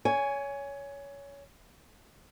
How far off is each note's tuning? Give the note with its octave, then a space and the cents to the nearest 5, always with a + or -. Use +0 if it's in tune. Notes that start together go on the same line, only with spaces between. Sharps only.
C#5 +20 G#5 +0